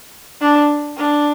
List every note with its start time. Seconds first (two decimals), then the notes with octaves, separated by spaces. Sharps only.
0.41 D4
0.97 D4